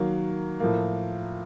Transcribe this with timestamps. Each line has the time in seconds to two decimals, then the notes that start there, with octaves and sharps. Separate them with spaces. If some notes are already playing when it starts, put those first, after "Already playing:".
Already playing: D#3 F#3 A#3
0.60 A2 F3 A#3